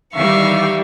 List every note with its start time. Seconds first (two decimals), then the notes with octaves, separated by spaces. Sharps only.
0.15 D#3 E3 G3 E5 F5 C#6